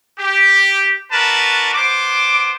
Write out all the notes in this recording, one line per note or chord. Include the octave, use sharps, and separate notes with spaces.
G4
D4 F#4 A#4 B4 A5
B3 C5 D6